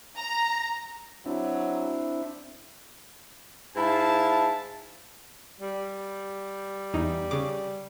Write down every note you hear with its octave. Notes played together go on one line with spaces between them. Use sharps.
A#5
F#3 C4 D4 E4
G#2 E4 F5 A5
G3
E2 D#4
C#3 D6